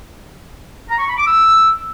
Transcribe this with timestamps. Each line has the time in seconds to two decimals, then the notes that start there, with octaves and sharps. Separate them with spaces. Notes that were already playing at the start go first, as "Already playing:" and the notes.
0.89 A#5
0.99 C#6
1.08 B5
1.18 D6
1.27 E6